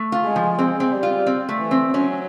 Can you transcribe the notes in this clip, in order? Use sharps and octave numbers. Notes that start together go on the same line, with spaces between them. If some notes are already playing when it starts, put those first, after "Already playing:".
Already playing: A3
F4
G#3
F3
G#3 C4
C4
G3
F4
C4
A3
E3
C4
F#3 C#4